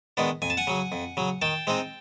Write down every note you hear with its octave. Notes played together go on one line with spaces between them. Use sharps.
D#3 G#3 B3 D4
F2 G#5
A5
F#5 G#5
C#3 F#3
F2
C#3 F#3
D#3 G5 A5
G#3 C4 D#4